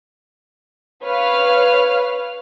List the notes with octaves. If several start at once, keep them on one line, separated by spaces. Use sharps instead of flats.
B4 C#5 F5 F6